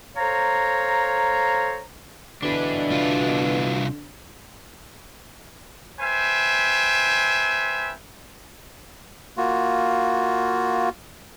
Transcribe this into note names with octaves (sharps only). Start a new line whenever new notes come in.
A4 C5 C#5 F5 A#5
B2 D3 E3 D4 B4
C2 F4
B4 C5 E5 G5 G#5
A#3 F4 F#4